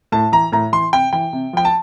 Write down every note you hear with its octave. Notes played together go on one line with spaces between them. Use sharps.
A2 A5
E3 A#5
A2 A#5
E3 C6
C3 G5
E3 G5
C3
F3 G5
A5